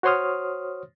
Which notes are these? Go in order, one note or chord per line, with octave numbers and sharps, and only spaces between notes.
F#4 C5 C#5 C6 D#6 F6